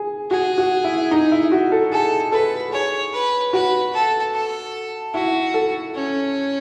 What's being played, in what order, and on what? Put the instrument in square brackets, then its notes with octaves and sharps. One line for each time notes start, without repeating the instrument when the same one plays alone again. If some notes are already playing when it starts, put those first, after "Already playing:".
Already playing: [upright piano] G#4
[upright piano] F#4 [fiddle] G#4
[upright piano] F#4
E4
D#4
E4
F#4
A4
[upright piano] G#4 [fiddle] A4
[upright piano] A4 [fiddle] B4
[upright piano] G#4 [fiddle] C#5
[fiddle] B4
[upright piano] F#4 [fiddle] B4
[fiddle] A4
A4
[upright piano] E4 [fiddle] F#4
[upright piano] A4
[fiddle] C#4